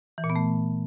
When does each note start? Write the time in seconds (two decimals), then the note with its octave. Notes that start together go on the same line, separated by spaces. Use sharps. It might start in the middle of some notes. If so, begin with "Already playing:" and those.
0.18 E3
0.24 A#2
0.30 B3
0.36 A3